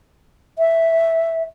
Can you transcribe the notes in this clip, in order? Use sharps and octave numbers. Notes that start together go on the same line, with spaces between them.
E5